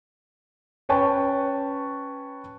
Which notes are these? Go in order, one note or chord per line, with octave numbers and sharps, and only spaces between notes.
C#4 B4 C#5 G5 A5 C#6